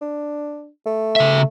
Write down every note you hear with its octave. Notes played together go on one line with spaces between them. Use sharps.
D4
A3
C#3 E5